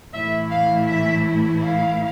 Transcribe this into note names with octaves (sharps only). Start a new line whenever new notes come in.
A2 E3 A3 E4 E5
F5
E5
F5